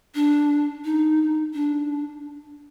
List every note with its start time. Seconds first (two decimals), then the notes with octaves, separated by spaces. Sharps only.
0.15 D4
0.85 D#4
1.54 D4